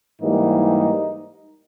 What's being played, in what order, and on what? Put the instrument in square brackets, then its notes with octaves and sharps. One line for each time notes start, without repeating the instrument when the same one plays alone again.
[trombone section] G#2 E3 G3 A#3 D#4